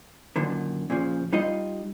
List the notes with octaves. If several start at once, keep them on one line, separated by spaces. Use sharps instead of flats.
F#2 A#2 D3 D#3
A#2 C#3 F3
G3 D#4 F4 D#5